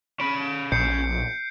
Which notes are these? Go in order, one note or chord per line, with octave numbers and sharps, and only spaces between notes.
C#4 B5 D7
A#1 G6 C7 C#7